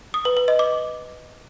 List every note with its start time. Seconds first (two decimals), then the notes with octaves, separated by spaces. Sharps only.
0.14 D#6
0.25 B4
0.37 B4
0.48 D#5
0.59 D6